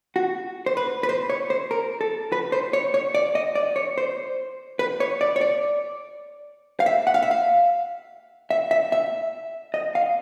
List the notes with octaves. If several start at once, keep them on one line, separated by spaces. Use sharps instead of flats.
F#4
C5
B4
B4
C5
C#5
C5
A#4
A4
B4
C5
C#5
C#5
D5
D#5
D5
C#5
C5
B4
C#5
D5
C#5
D5
F5
E5
F#5
F5
E5
F5
E5
E5
E5
D#5
F5